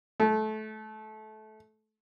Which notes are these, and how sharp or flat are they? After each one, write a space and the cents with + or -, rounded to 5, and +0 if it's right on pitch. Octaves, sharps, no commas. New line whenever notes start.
A3 -25